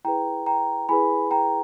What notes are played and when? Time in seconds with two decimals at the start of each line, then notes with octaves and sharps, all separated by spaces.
0.05 E4 G#4 B4 G5 A#5
0.46 G5 A#5
0.89 E4 G#4 B4 G#5 B5
1.31 G5 A#5